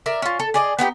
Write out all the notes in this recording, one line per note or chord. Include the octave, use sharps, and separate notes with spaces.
A#4 D5 E5
C#4 F4
A4
G#4 D5 D#5
B3 D#4 F#4 G4